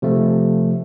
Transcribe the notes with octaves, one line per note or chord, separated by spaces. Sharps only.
C3 F3 A3